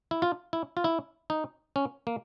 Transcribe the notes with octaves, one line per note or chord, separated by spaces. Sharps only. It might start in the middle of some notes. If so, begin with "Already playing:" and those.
E4
F4
E4
F4
E4
D#4
C#4
A#3